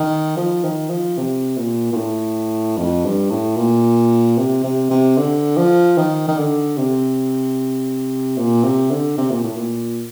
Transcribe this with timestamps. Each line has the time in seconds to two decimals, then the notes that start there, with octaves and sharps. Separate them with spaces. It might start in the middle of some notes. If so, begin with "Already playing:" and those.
Already playing: D#3
0.37 F3
0.64 D#3
0.90 F3
1.18 C3
1.57 A#2
1.93 A#2
1.97 A2
2.77 F2
3.05 G2
3.31 A2
3.57 A#2
4.38 C3
4.64 C3
4.90 C3
5.18 D3
5.57 F3
5.98 D#3
6.28 D#3
6.38 D3
6.78 C3
8.38 A#2
8.64 C3
8.90 D3
9.18 C3
9.31 A#2
9.43 A2
9.57 A#2